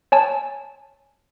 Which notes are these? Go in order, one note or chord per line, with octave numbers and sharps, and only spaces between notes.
C#5 G#5 A5